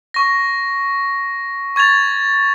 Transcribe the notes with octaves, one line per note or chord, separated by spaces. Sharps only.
C#6 A#6
C#6 G#6 A6 F7